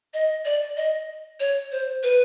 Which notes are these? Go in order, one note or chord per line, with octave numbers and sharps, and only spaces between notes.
D#5
D5
D#5
C#5
C5
B4